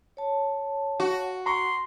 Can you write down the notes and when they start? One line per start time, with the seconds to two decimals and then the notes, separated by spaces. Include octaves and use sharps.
0.17 C#5 A5
1.00 F#4
1.46 A#5 C6 C#6